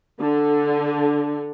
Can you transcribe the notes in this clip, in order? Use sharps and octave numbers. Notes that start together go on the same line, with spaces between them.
D3